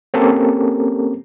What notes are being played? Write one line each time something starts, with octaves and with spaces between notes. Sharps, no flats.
A#3 C4 C#4 G4 A4 A#4